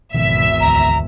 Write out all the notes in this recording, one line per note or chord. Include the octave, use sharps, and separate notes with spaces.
G#1 E2 B2 D#3 F3 E5
D2 A#5